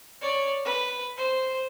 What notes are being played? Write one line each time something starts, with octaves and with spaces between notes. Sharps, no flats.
C#5 D5
B4
C5